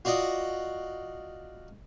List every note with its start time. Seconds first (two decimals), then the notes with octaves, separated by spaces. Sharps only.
0.05 F4 F#4 D5 D#5